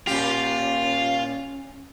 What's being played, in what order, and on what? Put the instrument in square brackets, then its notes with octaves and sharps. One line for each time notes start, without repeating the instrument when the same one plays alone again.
[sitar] A#2 G4 [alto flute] C#4 [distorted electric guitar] F4